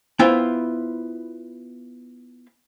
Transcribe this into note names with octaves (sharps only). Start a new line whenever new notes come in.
B3 E4 F4 C5 G5